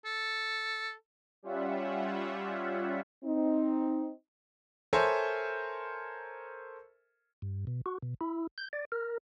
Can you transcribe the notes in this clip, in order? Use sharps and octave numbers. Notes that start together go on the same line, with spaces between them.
A4
G3 C#4 F4 E5 F#5
C4 D#4
A4 A#4 C5 C#5 E5 G#5
G2
B2
F#4
B2
E4
G6
D5
A#4